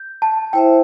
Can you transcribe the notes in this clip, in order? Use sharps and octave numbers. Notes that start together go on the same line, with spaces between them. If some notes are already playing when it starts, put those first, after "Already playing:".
Already playing: G6
A5
E4 C5 E5 G5